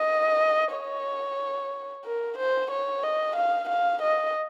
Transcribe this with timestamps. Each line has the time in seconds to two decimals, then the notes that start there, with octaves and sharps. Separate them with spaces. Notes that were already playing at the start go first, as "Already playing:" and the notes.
Already playing: D#5
0.74 C#5
2.05 A#4
2.38 C5
2.71 C#5
3.04 D#5
3.36 F5
3.69 F5
4.02 D#5